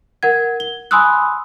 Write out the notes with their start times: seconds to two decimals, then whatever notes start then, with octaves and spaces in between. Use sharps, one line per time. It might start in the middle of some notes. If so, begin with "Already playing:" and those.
0.23 A#4 F#5 G#6
0.60 G7
0.91 G#5 B5 C6 D#6 E6 F#6